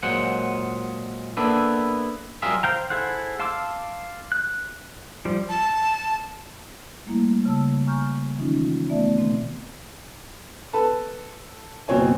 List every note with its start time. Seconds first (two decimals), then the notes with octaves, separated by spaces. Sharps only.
0.03 A#2 F#3 G#3 C5 F#5
1.37 A#3 B3 D4 E4 A4 B4
2.42 F#3 G3 F4 G#4 A#4 E5
2.63 C5 F5 G5 A#5
2.90 E4 G#4 A4 C5 F#5
3.40 F5 A5 C6 D6 E6
4.32 F#6
5.25 F3 G3
5.49 A5
7.06 G3 A3 A#3 E4
7.45 C#3 A5 E6
7.86 G#5 A#5 C#6 F6 G6
8.37 D#3 E3 G#3 C#4 D#4 F4
8.90 A3 B3 D5 E5
9.18 B2 D#3 A3 C4
10.73 A4 B4 A5
11.88 F#1 B2 C4 C#5 G#5